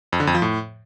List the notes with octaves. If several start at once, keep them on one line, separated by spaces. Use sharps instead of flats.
F2
D3
F2
F3
A2